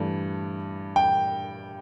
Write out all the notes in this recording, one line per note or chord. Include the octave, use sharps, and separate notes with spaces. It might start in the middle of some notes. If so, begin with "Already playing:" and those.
Already playing: G2 E3 A3
G5